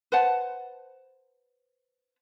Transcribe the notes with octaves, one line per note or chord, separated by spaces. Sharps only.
B4 C5 F#5 A5